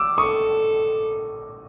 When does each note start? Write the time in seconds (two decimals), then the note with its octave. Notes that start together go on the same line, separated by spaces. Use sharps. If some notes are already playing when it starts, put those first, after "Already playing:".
Already playing: D6 E6
0.17 A4 C#6 D#6